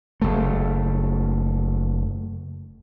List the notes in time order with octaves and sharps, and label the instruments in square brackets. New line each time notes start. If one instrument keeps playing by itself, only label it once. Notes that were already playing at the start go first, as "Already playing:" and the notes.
[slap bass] F#1 A3